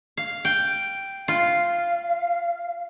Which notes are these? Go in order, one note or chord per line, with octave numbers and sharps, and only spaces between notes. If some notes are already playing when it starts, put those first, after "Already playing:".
F5
G5
F4 F5